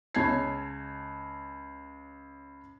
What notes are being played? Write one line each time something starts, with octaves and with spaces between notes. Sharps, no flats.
C#2 C#5 A5 G#6 C7